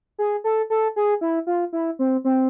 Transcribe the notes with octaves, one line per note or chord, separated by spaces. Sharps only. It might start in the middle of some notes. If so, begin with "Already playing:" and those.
G#4
A4
A4
G#4
E4
F4
E4
C4
C4